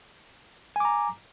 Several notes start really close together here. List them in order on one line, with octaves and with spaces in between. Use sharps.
G#5 D6 A#5